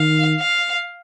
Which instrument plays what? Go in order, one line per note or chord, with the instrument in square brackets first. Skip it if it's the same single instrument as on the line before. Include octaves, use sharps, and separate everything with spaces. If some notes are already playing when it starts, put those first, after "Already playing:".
Already playing: [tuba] D#3 [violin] F5
[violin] F5